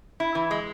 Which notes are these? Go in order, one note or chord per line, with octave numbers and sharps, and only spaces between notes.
E4
E3
G#3